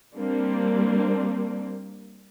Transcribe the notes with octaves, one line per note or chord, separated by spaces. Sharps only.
G3 A#3 C4 D4